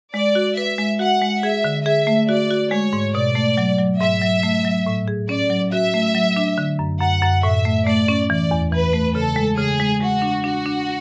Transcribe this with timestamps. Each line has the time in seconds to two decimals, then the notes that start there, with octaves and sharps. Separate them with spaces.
0.13 G#3 D5
0.35 F#4
0.56 B4 E5
0.78 G#3
0.99 F#4 F#5
1.21 G#3
1.43 G#4 E5
1.64 D3
1.85 G#4 E5
2.07 A3
2.28 F#4 D5
2.51 F#4
2.71 G#3 C#5
2.93 G#2
3.14 B2 D5
3.35 A3
3.57 F#3
3.78 F#3
4.01 G#2 E5
4.22 F#3
4.43 A3
4.65 F#3
4.86 A2
5.08 G#4
5.29 C#4 D5
5.50 F#3
5.72 F#4 E5
5.94 A3
6.15 F#3
6.36 D4
6.58 D3
6.79 F#2
7.01 F#2 F#5
7.22 F#2
7.43 A2 E5
7.65 A3
7.86 A3 D5
8.08 C#4
8.30 E3 D5
8.51 E2
8.72 E3 B4
8.93 A3
9.15 C#3 A4
9.36 G#3
9.58 C#3 G#4
9.80 G#3
10.01 G#3 F#4
10.22 D4
10.43 D4 F#4
10.66 D4